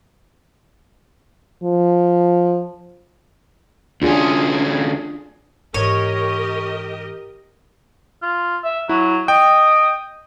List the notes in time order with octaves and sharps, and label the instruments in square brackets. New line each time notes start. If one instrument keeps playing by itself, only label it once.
[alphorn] F3
[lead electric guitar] D2 C#4 [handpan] D4 F4 G#4
[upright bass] G#2 E3 [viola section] G4 A#4 D#5 [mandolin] C#5
[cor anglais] F4
E5
[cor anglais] F#3 [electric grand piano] E4
[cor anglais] D#5 [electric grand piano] G5